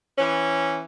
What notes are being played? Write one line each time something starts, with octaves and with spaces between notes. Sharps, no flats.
E3 C#4